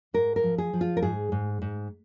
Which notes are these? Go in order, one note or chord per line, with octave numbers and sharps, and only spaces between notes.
G#2 A#4
A#4
F3
G#4
F3
F4
A#4
G#2 G#4
G#2
G#2